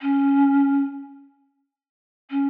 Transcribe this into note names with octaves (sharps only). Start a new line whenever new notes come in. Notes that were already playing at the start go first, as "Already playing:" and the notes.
C#4
C#4